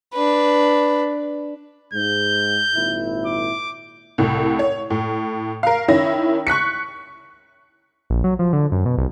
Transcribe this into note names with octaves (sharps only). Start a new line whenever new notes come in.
D4 B4
G#2 G6
G#1 A#2 E4
D6
C2 A2
C#5
A2
A#4 F5
D#3 C#4 E4 A#6
C#6 F#6 B6 C#7
A#1
F#3
F3
D3
F#2
B2
C2